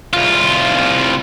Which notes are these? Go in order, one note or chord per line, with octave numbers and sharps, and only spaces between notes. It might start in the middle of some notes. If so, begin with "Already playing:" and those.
C2 F4